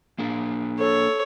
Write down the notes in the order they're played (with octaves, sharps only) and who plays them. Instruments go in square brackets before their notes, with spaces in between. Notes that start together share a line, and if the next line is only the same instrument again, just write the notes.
[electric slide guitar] A#3 D4 G#4
[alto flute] A4 [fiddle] C#5